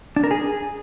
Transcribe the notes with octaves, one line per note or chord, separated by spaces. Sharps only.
D4
A#4
G#4